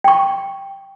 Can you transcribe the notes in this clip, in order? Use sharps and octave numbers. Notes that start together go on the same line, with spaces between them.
G5 C#6